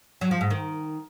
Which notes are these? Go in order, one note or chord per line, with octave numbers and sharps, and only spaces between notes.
F#3
F3
G#2
D#3